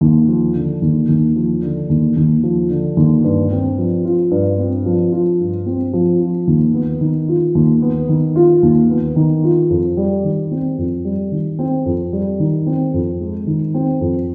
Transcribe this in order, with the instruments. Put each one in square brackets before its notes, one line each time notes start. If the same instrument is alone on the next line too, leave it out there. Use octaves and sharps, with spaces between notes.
[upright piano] D#2
F3
D3
D#2
D#2
F3
D3
D#2
D#2
F3
D3
D#2
G2
C4
F3
F4
G2
C4
F3
F4
G2
C4
F3
F4
D#2
B3
D#3
F4
D#2
B3
D#3
F4
D#2
B3
D#3
F4
F2
G3
D#3
C4
F2
G3
D#3
C4
F2
G3
D#3
C4
F2
G#3
D#3
C4
F2